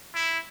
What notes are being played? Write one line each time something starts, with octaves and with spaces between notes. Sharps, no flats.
E4